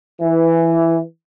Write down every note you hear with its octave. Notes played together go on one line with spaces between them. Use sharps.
E3